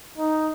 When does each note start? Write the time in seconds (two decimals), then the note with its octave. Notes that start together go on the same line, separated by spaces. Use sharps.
0.18 D#4